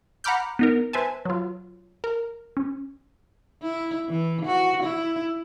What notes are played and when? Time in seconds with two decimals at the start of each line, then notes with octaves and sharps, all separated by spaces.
0.24 F#5 A#5 B5 D6 F6 G6
0.59 B3 D#4 A#4
0.93 B4 C5 E5 G#5 A5
1.25 F#3 F4
2.04 A#4
2.57 C#4
3.62 E4
4.09 E3
4.46 F#4
4.83 E4